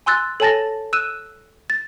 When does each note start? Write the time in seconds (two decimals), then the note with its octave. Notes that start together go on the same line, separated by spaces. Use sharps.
0.06 G#5 C6 E6 F#6 A6
0.40 A4 C#5 G#5 A5 A6 A#6
0.93 E6 F#6 D#7 E7
1.70 A6